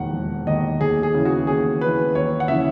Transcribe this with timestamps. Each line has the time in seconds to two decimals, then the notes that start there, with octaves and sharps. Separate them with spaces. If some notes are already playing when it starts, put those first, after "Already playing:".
Already playing: E1 D#2 D#3 F#5
0.13 E1
0.47 D#2 D#3 D#5
0.80 D#2 G#4
1.03 G#4
1.14 C#3 E3
1.25 F#4
1.47 D#2 G#4
1.81 C#3 E3 B4
2.15 D#2 C#5
2.40 F#5
2.48 C#3 E3 E5